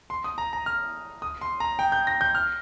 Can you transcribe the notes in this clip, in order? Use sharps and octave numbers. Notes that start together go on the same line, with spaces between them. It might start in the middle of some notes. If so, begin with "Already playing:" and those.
C6
D#6
A#5
A#5
F6
D#6
C6
A#5
G5
G6
A#6
G6
F6